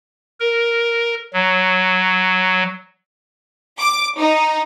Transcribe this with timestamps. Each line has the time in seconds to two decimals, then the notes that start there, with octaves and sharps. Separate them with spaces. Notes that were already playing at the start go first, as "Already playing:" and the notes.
0.40 A#4
1.33 F#3
3.79 D6
4.18 D#4